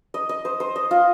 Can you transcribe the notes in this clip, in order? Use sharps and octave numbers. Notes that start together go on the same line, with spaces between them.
D#5
D#5
C5
C5
D#5
F4